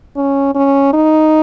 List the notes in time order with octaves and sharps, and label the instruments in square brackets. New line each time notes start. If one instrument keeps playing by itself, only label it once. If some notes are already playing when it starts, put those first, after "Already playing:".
[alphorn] C#4
C#4
D#4